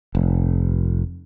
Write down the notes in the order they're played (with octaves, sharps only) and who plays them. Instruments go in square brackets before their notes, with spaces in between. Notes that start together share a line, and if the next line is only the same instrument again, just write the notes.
[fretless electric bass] F1